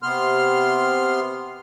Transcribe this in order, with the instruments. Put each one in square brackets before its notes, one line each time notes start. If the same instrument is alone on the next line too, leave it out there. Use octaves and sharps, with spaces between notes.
[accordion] C3 B3 C6 F6